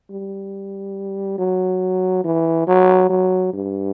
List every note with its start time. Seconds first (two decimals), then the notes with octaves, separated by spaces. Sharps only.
0.10 G3
1.38 F#3
2.24 E3
2.67 F#3
3.09 F#3
3.53 G2